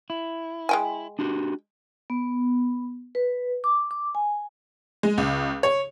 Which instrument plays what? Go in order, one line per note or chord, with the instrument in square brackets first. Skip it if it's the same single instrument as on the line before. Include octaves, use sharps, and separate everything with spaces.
[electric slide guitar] E4
[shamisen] G#3 G5 G#5
[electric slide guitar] D4 F#4 G4
[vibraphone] B3
B4
D6
D6
G#5
[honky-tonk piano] G#3
C#2
C#5